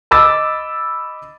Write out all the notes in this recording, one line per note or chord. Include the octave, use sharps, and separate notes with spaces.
D#5 B5 D6 E6 A6